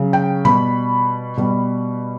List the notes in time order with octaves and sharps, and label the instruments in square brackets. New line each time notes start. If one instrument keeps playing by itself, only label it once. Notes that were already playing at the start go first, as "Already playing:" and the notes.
Already playing: [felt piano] C#3 F#3
G5
B2 G3 B5
B2 G3